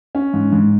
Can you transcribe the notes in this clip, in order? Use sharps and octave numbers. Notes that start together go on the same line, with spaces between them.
C#4
G#2
G#2